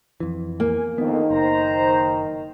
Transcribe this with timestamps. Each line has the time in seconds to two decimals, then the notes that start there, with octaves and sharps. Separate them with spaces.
0.20 F2 E3
0.60 A#3 G#5
0.98 F2 G#2 D3 D#3 B3
1.31 F#1 C5 A#5